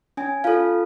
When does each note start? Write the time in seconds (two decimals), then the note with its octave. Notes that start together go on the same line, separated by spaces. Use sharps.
0.17 C#4 G#5
0.44 F4 A4 F5